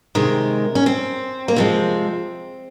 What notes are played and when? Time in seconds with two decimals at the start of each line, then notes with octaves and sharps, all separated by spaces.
0.15 C3 D#3 G#3 A#4
0.75 C#4
0.86 C4
1.48 A#3
1.56 C3 F3 G#3 C4